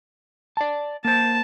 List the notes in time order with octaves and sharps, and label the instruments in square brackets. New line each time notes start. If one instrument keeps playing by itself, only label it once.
[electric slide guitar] D5 A5
[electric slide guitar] A#3 C5 [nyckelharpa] A5